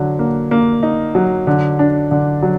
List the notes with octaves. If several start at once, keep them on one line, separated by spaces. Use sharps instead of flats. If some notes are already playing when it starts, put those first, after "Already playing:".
Already playing: D3 F#3
A#3
A#3
D#4
F#3
D3
D4
D3
F#3